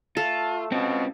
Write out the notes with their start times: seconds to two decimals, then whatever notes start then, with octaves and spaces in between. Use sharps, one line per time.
0.17 A3 F4 A4
0.72 B2 C4 C#4 F4